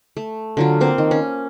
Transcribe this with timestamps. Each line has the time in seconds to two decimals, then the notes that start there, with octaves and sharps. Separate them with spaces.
0.17 A3
0.57 D3 F#3 F4
0.81 A#3 C4 C5
0.98 D#3
1.11 C#4